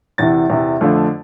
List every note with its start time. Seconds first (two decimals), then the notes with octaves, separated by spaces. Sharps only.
0.18 E2 C3 E3 A6
0.50 E2 C3 E3
0.81 F2 D3 A3 D4 F4